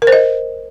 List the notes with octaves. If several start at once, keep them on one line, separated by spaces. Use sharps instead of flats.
A#4
C5
D#5